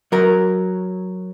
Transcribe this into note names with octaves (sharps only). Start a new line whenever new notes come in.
F#3 A#4